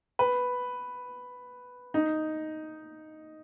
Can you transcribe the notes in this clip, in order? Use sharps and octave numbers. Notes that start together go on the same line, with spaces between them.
B4
D#4